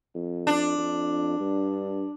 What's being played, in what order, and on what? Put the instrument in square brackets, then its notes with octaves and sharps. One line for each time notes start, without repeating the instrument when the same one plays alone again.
[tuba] F2
[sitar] D4
[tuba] F2
G2